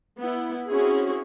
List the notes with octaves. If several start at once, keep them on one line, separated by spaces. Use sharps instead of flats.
B3 E4
C4 C#4 E4 F#4 G#4